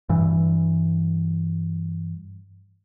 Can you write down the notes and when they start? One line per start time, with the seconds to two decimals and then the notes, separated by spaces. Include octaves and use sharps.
0.09 G2 E3